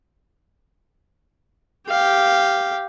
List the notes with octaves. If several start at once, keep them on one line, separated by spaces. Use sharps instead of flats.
G4 F5